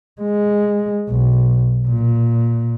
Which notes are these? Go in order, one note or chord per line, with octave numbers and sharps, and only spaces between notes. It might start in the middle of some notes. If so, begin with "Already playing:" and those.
G#3
B1
A#2